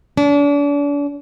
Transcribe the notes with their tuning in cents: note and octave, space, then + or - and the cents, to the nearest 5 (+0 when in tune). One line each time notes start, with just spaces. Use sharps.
D4 -40